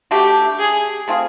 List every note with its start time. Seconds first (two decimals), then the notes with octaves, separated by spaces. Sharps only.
0.11 A3 D4 F#4 G4
0.59 G#4
1.08 A3 C4 F4 G#4